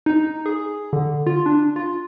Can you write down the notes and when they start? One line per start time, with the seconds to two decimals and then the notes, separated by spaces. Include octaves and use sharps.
0.06 D#4
0.46 G#4
0.93 D3
1.26 F4
1.46 D4
1.76 F4